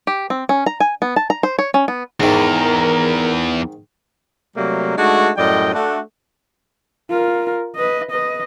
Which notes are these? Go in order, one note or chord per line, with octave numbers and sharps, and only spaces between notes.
G4
C4
C#4
A#5
G#5
B3
A5
A#5
C5
C#5
C#4
B3
E2 G#2 D#3 A#4
C3 F#3 G3 A3 A#3
G#3 A3 D4 D#4 F#4
F#2 A2 G3 D5 D#5 G5
A3 D4 F#4
F4 A#4
B4 D#5
B4 D#5